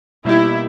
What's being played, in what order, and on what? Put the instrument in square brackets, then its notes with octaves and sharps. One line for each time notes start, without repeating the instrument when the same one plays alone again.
[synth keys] B2 G3 A#3 D#4 G4 [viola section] E4